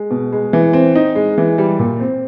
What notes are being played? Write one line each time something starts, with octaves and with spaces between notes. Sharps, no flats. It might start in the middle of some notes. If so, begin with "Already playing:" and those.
Already playing: G#3
B2
G#3
E3
C4
D#4
G#3
E3
G3
A#2
C4